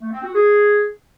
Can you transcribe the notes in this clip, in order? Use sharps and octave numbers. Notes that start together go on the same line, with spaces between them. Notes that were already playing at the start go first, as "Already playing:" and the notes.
A3
C4
F#4
G#4